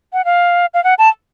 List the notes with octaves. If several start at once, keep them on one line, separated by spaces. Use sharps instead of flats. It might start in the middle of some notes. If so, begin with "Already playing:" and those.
F#5
F5
F5
F#5
A5